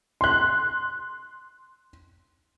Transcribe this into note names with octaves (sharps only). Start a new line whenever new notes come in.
C6 F#6